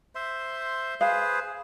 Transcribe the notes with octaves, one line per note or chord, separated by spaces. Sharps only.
C5 E5 C6
G#4 B4 C5 F5